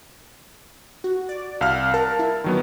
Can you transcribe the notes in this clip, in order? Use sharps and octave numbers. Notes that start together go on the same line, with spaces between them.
F#4
D5
C2 F5 F6
A#4 A5
E4
D#3 F#3 B3